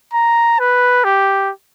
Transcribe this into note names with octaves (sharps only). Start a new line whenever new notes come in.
A#5
B4
G4